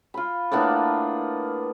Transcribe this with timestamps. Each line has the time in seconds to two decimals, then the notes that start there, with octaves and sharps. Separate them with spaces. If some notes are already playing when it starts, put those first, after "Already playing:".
0.14 F4 B5
0.51 A2 A#3 B3 D4